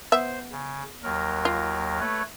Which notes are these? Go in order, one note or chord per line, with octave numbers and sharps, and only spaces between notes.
B3 C5 E5
C#3
D#2 F#3 A#4
F4
A3 B4 C#5